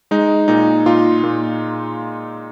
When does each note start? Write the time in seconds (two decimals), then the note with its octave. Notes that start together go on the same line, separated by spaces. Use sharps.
0.11 G#3 D#4
0.48 A#2 D#4
0.86 A#2 F4
1.24 A#2